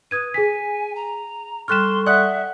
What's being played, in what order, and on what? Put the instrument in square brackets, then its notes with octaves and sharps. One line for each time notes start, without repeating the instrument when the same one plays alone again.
[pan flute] B4 [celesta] D#6 G#6 D#7
[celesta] G#4 B6 [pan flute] G#5
[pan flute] A#5
[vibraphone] G3 A4 C#6 [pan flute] C6 [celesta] F6 F#6 E7
[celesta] D5 D#6 [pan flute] E5 [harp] F#5 F#6